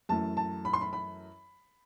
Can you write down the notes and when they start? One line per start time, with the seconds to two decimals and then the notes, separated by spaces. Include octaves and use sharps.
0.09 F#2 E3 A3 A5
0.37 A5
0.65 B5
0.73 C6
0.81 B5
0.93 B5